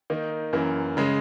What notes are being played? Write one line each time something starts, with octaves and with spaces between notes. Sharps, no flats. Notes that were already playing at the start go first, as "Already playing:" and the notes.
D#3 A#3 D#4
F#2 E3 A#3
C#3 G#3